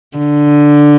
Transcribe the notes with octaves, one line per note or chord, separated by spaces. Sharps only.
D3